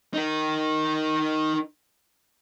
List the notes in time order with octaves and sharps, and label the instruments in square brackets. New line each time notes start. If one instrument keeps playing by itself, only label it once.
[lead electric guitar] D#4 A#4